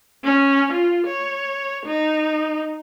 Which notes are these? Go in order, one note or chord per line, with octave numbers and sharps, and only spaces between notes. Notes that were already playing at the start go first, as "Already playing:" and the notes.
C#4
F4
C#5
D#4